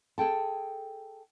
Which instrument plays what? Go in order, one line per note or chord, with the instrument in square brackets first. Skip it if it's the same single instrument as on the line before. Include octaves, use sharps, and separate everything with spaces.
[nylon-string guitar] G#4 A4 G5 A5